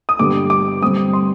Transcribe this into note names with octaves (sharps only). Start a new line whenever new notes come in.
D#6
G2 D3 G3 B3 D6
D6
G2 D3 G3 C4 D#6
C6